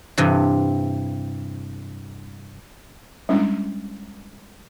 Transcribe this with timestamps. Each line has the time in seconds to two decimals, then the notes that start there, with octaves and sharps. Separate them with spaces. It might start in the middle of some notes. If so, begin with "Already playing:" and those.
0.18 G2 C3 E3
3.29 G3 G#3 C#4 D4 E4